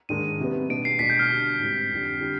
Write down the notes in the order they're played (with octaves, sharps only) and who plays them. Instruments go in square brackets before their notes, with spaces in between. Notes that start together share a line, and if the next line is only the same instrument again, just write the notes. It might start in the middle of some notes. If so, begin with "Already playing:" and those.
[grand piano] G#2 D#3 G#3 D4 [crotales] D#7
[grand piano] C3 G3 B3
[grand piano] B2 B3 D4 [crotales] D7
[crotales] C7
[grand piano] B2 G#3 D4 [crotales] B6
[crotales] G6
F6
[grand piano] D3 G3 D4
G#2 G3 C4 D#4
F2 D3 G3
D3 G3